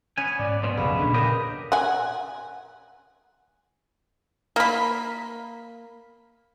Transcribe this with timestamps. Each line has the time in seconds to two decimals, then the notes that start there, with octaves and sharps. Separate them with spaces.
0.18 B3 C#4 G#5
0.39 G#2 D5
0.63 F#2 B2 C5
0.77 A#1 F2 C#3 B4
0.99 A#2 D3 A#3
1.14 C#3 G4 A#4 D#5
1.72 F#5 G#5
4.56 A#3 B5